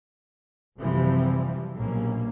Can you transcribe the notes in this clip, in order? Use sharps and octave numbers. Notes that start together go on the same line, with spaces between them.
F#1 C3 E3 F3 G3
A#1 B2 F#3 G3 A#3 C#4